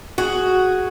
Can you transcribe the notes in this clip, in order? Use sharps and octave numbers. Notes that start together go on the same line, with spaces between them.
F#4 G#4